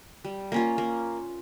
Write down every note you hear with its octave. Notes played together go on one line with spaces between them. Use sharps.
G3
A#3 C#4 F4
A#3